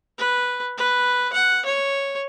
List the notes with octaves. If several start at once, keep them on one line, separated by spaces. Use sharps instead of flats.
B4
B4
F#5
C#5